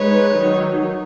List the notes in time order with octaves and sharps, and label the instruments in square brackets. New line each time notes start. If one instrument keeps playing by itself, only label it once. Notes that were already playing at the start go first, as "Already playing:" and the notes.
Already playing: [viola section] G#3 D#4 B4 [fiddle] C#5
[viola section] D#3 F#3 D#4